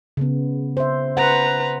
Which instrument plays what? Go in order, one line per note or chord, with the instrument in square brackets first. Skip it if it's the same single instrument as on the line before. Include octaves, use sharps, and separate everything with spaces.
[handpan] C#3 B3
C5 E5
[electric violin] B4 A#5 [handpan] C5 F#5